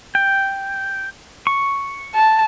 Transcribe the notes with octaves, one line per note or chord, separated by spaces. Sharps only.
G5
C#6
A5